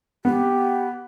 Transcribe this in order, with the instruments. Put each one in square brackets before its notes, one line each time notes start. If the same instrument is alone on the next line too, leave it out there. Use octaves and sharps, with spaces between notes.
[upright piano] B3 [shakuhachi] G4